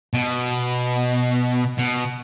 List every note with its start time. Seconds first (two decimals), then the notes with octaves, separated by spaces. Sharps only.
0.14 B2
1.79 B2